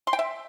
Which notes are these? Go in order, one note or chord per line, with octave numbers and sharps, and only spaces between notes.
C6
G5
E5